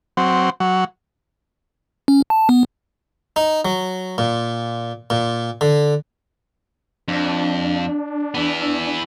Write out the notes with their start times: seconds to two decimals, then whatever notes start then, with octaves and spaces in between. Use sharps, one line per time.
0.17 F#3 C4
0.60 F#3
2.08 C#4
2.30 A5
2.49 B3
3.36 D#4
3.65 F#3
4.18 A#2
5.10 A#2
5.61 D3
7.08 F2 D4
8.35 E3 B3